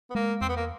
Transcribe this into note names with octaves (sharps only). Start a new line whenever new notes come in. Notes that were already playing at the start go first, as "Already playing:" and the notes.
B3
G#3 A#3
E2 C4
B3
A#3